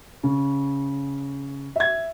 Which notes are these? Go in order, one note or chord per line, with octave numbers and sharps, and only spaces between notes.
C#3
E5 G#6